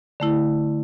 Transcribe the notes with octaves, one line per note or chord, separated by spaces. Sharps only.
D3 A3 E4